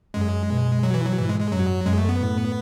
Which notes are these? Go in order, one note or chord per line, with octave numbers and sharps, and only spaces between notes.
F#2 G#3
B2
F#3
E3
F#3
G#2 E3
G#3
G#3
F#2 F#3
F#2 G#3
A3
B3
A2